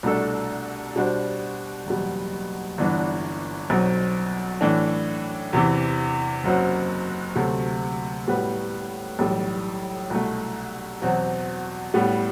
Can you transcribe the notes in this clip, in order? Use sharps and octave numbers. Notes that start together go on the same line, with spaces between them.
C2 B2 A3 D4 A4
B2 G3 D4 F#4 C5
F#1 E2 B2 G3
G1 G2 E3 B3 D4
B1 B2 F#3 C4
A2 E3 A3 D4
E2 C3 E3
F#1 F#2 F#3 C4 F#4
D2 C3 F#3 A3
A2 G3 B3 F#4 B4
B1 A2 E3 G3
C2 B2 A3
E2 B2 F#3 C4
A2 G3 B3